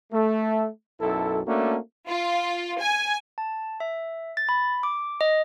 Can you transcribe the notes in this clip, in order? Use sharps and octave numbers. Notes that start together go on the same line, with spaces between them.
A3
B1 F#2 E4 A4
A3 A#3 C#4 D4 F#4
F4
G#5
A5
E5
A6
B5
D6
D#5